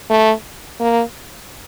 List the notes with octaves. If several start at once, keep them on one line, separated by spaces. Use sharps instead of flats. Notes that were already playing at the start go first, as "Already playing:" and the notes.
A3
A#3